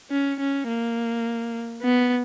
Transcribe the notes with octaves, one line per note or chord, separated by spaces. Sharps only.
C#4
C#4
A#3
B3